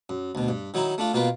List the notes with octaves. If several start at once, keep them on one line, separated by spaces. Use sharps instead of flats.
F#2
D2 B2
G2
D#3 F#3 D#4 E4
A3 D4 F4
B2 A#3 F4 B4